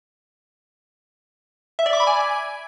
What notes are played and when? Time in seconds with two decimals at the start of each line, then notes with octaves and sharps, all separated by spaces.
1.79 E5
1.86 D5
1.93 D6
2.00 B5
2.07 G#5